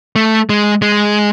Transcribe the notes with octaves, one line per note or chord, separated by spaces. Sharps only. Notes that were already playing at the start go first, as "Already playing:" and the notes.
A3
G#3
G#3